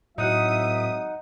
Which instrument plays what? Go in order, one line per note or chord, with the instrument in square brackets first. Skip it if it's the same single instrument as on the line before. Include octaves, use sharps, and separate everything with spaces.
[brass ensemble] G#1 F#3 E5 [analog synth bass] A2 [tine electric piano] D#4 F#5 [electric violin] D#6